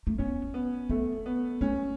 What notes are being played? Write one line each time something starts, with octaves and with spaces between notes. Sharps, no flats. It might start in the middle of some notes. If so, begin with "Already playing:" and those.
A3
B3 C#4
B3
A3 B3
B3
A3 C#4